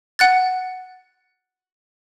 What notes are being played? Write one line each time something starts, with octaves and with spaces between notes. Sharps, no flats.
F#5 F#6 A6